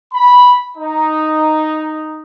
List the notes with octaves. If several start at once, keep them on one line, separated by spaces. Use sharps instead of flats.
B5
D#4